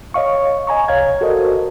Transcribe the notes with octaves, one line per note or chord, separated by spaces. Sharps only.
C#5 D#5 F5 C#6
D#5 G#5 A#5 C#6
C2 C#5 F5 G#6
F#4 A4 A#4 C5 D5 D#5